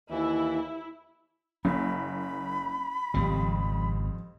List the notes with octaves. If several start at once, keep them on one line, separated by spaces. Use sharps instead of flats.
D#2 E3 E4
F#1 A#3 C#4 B5
G#1 F2 C#3 G3